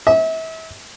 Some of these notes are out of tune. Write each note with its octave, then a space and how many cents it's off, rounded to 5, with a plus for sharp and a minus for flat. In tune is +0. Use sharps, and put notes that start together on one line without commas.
E5 -35